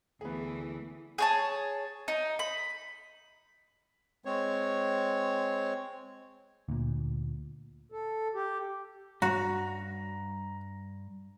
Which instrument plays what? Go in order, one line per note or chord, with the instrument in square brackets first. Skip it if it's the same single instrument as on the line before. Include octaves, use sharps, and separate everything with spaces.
[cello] D2 E3 [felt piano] B3 G#4
[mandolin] G#4 C#5 A5
D#4
B5
[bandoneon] G#3 C4 C#5
[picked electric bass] D2 A#2
[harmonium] A4
G4
[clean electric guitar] G2 [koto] F#4 [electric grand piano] A#5